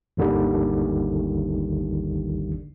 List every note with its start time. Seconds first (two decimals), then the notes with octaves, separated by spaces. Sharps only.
0.17 G#1 D#2 D3 D#3 G3